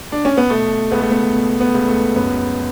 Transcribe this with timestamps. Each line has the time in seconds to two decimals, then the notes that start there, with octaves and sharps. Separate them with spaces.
0.12 D4
0.25 C#4
0.37 B3
0.50 B2 A3
0.91 C#2 B3
1.01 A3
1.11 B3
1.33 B2
1.60 B3
1.74 C#2
1.88 A3
2.15 F#2 B3